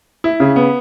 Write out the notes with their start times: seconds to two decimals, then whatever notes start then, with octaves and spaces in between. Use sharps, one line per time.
0.24 E4
0.40 C#3
0.56 B3